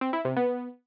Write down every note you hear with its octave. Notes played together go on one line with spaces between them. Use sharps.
C4
E4
C3
B3